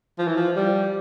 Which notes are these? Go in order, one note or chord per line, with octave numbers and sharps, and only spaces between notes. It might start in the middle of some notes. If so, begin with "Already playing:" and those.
F3
E3
F3
G3